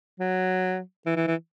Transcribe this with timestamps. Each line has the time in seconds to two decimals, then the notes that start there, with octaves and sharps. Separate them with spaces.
0.20 F#3
1.06 E3
1.16 E3
1.27 E3